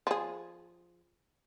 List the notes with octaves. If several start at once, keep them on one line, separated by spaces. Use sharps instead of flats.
F3 G#4